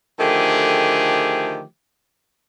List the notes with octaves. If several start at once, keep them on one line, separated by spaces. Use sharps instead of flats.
D3 D#3 F3 A3 G4 G#4